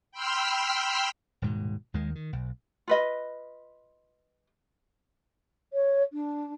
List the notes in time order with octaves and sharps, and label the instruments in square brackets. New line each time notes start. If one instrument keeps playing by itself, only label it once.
[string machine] G5 B5 C6 E6 F6 B6
[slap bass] D#1 G#2 B2
D#2 D#3 G#3
D#3
B1
[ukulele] F4 B4 D#5
[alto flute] C#5
D4